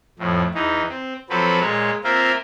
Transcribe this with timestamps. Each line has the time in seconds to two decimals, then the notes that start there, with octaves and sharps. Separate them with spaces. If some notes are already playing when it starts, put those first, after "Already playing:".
0.19 F2 A2
0.54 E2 E3 D#4
0.89 C4
1.30 F3 F#3 C4 A4 B4
1.60 A#2 G#3 C#5
2.04 A#3 C4 F4 A#4 E5